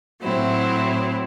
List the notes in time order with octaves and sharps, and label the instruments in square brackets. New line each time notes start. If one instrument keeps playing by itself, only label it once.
[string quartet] A2 F#3 C4 E4